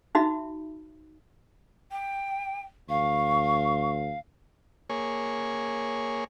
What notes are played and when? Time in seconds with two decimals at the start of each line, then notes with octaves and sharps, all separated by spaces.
0.15 D#4 F#4 E5 B5
1.91 G5
2.89 D2 F5 C#6
4.90 A#3 G#4 C#5